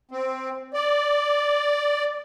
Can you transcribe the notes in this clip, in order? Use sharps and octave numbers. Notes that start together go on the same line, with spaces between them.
C4
D5